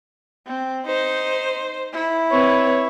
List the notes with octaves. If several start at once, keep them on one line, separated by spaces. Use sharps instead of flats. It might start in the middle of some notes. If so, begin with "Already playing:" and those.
C4
D#4 C5
E4
C4 B4 C#5